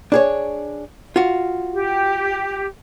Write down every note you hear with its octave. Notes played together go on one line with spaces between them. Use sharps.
D4 G#4 C#5
F4 F#4
G4